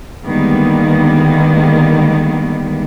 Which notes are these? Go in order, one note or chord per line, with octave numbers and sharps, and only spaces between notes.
D3 D#3 G3 G#3 A#3 B3